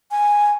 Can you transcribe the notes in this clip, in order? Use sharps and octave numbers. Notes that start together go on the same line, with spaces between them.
G#5